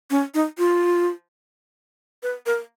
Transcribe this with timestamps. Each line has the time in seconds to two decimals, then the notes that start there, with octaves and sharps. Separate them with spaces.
0.10 C#4
0.34 D#4
0.58 F4
2.23 B4
2.46 A#4